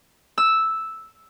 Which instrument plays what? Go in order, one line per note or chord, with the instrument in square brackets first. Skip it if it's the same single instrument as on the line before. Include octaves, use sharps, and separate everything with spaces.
[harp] E6